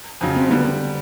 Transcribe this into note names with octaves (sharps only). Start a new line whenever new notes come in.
F2 C#3 F#3
C4
D3 G3 B3